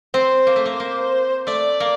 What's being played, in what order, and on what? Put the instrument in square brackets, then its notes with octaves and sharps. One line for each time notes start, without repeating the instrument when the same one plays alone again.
[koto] C4 [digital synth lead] C5
[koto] A#3
A3
A#3
A#3
[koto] A3 [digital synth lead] D5
[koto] A#3